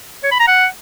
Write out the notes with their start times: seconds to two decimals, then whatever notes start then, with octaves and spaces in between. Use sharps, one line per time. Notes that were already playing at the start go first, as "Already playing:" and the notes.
0.23 C#5
0.32 B5
0.40 A#5
0.48 F#5